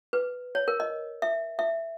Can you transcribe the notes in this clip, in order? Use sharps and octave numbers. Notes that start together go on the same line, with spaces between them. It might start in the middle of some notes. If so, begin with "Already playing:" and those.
B4
C#5
A#4
D#5
E5
E5